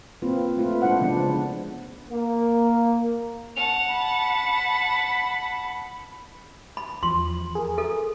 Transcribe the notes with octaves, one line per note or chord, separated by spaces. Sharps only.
A#3 C4 F4 B4
A3 F4 B4
G#3 D4 E4 C5 F#5
C#3 F3 B3 D4
A#3
F#5 A5 F7
B5
B5
E2 F3 C6
G#4 A#4
A4